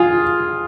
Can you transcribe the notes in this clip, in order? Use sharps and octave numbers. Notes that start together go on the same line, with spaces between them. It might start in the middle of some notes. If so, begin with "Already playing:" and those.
Already playing: F4 G#4